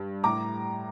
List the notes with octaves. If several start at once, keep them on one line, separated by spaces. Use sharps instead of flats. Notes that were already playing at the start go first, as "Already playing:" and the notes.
Already playing: G2
A2 A#5 D6